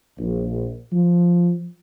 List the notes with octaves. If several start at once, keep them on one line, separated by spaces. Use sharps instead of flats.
A#1
F3